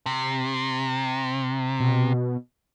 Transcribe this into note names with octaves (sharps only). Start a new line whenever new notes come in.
C3
B2